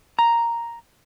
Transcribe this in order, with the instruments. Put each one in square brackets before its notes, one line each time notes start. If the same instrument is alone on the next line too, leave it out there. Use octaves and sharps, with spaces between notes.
[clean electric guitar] A#5